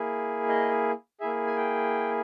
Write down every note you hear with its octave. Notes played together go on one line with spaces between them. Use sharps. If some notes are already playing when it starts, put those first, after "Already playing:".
Already playing: A#3 E4 G#4
D#5
A#3 E4 G#4 E5
G#5
G5